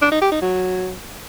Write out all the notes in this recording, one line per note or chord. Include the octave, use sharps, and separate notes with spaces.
D4
D#4
G4
D#4
F#3